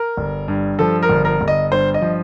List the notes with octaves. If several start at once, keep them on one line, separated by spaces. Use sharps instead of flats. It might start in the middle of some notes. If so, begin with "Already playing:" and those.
Already playing: A#4
G1
G2
F3 A4
A#4
G1
A#4
G1
D#5
G2 C5
D#5
F3